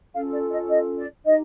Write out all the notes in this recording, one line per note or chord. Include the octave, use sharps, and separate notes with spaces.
C#4 F4 A4 F5
D5
D#5
D#5
D5
D#4 G4 D#5